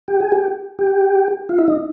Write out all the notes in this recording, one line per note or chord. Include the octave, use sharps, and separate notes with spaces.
G4
G#4
G4
G4
F4
E4
D#4